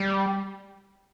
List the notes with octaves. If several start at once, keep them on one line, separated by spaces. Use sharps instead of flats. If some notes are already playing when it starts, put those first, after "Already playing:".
Already playing: G3